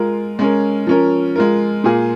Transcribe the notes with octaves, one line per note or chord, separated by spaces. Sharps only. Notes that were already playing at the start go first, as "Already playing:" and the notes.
Already playing: G#3 F4 A#4
G#3 C#4 A#4
F3 C#4 A#4
G#3 F4 A#4
A#2 A#3 F4 G#4